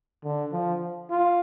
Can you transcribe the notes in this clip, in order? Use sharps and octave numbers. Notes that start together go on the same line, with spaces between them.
D3
F3
F4